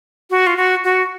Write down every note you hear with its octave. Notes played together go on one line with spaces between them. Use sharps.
F#4
F4
F#4
F#4